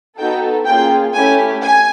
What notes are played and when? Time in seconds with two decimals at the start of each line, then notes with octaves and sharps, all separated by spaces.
0.17 B3 D#4 F#4 A4 G5
0.65 A#3 C#4 F4 G#4 G5
1.14 A3 C#4 E4 G4 G#5
1.62 G#5